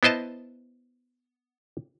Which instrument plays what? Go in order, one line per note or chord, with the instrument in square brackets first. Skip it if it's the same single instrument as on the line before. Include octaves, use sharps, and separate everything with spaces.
[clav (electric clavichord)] B3 E4 C5 D#5 A5